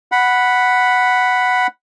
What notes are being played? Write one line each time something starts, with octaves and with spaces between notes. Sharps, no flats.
F#5 B5